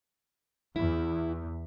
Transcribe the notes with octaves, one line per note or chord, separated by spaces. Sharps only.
E2 E4